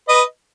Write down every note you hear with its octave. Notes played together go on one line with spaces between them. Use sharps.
B4 D#5